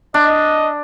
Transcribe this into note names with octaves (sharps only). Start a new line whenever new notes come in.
D4 D#5